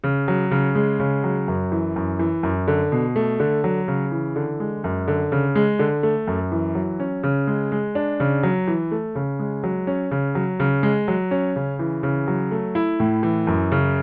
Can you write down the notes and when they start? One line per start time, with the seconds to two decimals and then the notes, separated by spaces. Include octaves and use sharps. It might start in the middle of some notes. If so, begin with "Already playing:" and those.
0.04 C#3
0.28 F#3
0.51 C#3
0.75 G#3
0.99 C#3
1.24 F#3
1.48 F#2
1.72 E3
1.96 F#2
2.19 E3
2.43 F#2
2.68 D3
2.92 B2
3.16 A3
3.40 D3
3.64 F#3
3.88 C#3
4.12 E3
4.36 D3
4.60 G#3
4.84 F#2
5.08 D3
5.32 C#3
5.56 G#3
5.79 D3
6.03 A3
6.27 F#2
6.52 E3
6.75 F#3
7.00 C#4
7.23 C#3
7.47 G#3
7.72 G#3
7.95 D4
8.20 C#3
8.43 F#3
8.68 E3
8.92 A3
9.15 C#3
9.39 G#3
9.64 F#3
9.87 C#4
10.11 C#3
10.35 F#3
10.60 C#3
10.83 G#3
11.08 F#3
11.31 C#4
11.56 C#3
11.79 E3
12.03 C#3
12.28 F#3
12.52 A3
12.75 E4
13.00 A2
13.23 E3
13.47 F#2
13.72 C#3